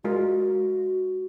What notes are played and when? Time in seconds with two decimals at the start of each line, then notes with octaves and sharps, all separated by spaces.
0.04 G#3 F4 F#4 A#4